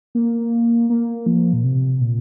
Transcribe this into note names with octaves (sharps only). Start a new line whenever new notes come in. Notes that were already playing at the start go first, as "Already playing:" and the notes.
A#3
A#3
F3
A#2
C3
A#2